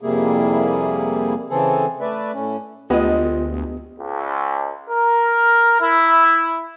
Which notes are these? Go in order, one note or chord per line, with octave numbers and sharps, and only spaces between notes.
F2 C3 G3 A#3 E4 G#4
C#3 E3 C4 G#4 A4
A3 B4 D5 E5
A2 C#4
D2 G#3 B3 F4 G4 D#5
C#2
A#4
E4